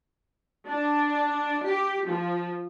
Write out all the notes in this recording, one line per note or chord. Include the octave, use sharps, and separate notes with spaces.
D4
G4
F3